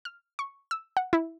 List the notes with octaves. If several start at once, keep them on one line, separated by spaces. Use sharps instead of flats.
F6
C#6
E6
F#5
E4